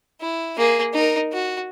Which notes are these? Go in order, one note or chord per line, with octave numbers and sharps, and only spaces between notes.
E4
A#3 G#4
D#4 A#4
F#4